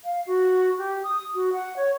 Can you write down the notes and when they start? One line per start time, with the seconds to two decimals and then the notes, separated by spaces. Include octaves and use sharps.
0.04 F5
0.26 F#4
0.78 G4
1.04 D#6
1.34 F#4
1.53 F#5
1.77 C#5